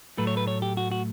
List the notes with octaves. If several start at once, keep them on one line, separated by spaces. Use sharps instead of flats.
A2 F#3 A3 B4
C#5
B4
C#5
G4
F#4
F#4